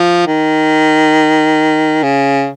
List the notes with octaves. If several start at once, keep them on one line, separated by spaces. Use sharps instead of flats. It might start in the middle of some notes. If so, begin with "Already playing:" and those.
Already playing: F3
D#3
C#3